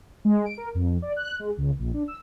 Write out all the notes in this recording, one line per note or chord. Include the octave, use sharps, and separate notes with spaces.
G#3
D7
A#4
F2
D5
F#6
G#3
C#2
A#1
D4
E6